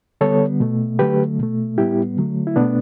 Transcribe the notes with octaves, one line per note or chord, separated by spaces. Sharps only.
D3 G3 B3 A4 C#5
B2 A3
D3 F#3 A3 G4 B4
B2 A3
A2 G3 B3 E4 G4
D3 F#3 A3
E4
B2 A3 B3 D4